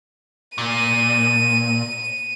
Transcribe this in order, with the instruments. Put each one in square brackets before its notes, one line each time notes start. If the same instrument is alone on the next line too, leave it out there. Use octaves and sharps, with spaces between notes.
[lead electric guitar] A#2 [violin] D#7